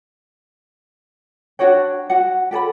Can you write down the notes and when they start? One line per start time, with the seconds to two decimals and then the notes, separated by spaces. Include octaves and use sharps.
1.59 D4 F#4 C#5 G5
2.10 F#4 F#5
2.51 G4 A4 G#5 B5